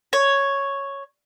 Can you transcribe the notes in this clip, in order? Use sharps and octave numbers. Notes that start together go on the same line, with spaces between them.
C#5